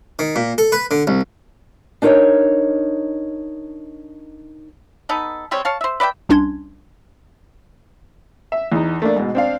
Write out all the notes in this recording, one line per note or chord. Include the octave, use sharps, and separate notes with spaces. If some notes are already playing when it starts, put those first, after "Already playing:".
D#3
A#2
A4
B4
D3
C2
D4 D#4 A#4 C5 C#5 D#5
B3 D#4 A4
G3 G#3 C4 C#5
C#5 F5 A5
C5 E5
B4 D5 E5 G5
C2 C#4 D4 C6 G#6
E5
E2 D#4
A3 A#3 D4
G#2 B2
C4 D4 F5